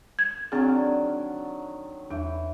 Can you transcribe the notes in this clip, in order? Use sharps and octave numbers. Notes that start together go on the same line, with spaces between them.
G#6
D3 D#3 F#3 C4 G#4
E2 E3